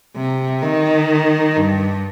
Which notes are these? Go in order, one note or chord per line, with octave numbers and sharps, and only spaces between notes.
C3
D#3
G2